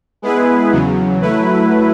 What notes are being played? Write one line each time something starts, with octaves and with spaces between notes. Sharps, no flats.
G#3 B3 E4 G#4 B4
E2 C#3 F#3
F#3 A3 E4 B4